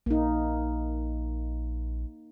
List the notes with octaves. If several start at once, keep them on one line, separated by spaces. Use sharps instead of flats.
A#1 A#3 D#4